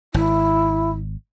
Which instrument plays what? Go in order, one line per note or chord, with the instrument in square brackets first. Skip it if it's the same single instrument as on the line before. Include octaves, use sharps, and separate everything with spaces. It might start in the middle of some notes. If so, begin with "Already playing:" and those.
[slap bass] G#1 [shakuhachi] E4